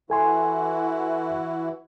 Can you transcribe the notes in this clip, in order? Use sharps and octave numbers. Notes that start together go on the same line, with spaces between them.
E3 E4 F#4 A4 G#5 C6